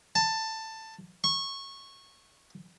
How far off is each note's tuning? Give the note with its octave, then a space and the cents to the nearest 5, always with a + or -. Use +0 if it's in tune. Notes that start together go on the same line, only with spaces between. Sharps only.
A5 +15
C#6 -15